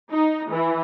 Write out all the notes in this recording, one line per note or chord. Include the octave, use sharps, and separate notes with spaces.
D#4
E3